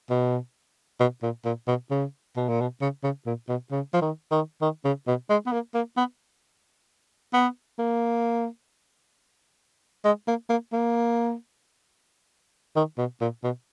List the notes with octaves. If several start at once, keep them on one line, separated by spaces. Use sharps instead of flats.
B2
B2
A#2
A#2
B2
C#3
B2
A#2
B2
C#3
C#3
A#2
B2
C#3
F3
D#3
D#3
D#3
C#3
B2
G#3
B3
A#3
A#3
B3
B3
A#3
G#3
A#3
A#3
A#3
D#3
B2
A#2
B2